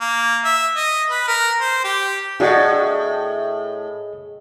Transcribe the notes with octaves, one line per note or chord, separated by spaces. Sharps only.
A#3
E5
D#5
B4
A#4
C5
G4
A2 D4 F#4 G#4 D#5 F#5